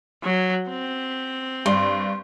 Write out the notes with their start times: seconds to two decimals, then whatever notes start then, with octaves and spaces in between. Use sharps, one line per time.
0.23 F#3
0.69 C4
1.66 G2 D5 C6